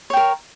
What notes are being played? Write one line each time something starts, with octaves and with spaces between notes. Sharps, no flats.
A#4 C#5 G5